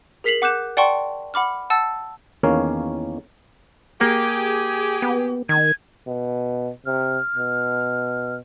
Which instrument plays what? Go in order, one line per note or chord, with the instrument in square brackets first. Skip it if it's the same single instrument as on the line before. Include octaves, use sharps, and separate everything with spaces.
[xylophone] G#4 A#4 B6 C7 F7 F#7
F#5 D6 F#6 G6 E7
D5 F#5 G5 A5 C6 C#6
F#5 B5 D6 F6
F#5 A5 E6 A6
[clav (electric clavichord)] E2 D#3 A#3 C#4 C#5 F5
[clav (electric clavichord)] A#3 [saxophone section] G4 G#4
[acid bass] B3
[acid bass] D#3 [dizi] G#6
[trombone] B2
[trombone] C3 [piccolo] F6
[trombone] B2